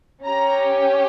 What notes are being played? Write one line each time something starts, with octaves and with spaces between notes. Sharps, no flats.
C#4 G4 A#5